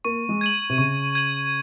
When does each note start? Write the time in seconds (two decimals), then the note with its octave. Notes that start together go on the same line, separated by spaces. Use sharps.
0.05 A#3 C#6
0.29 G#3
0.41 G#6 D#7 F#7
0.70 C3
0.78 C#3 C#6
1.15 G#6 D#7 F#7